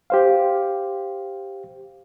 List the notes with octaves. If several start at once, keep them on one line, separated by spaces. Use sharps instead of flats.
G4 C5 F5